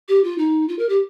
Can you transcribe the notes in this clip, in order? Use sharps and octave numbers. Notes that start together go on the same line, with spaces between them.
G4
F4
D#4
F4
A#4
G4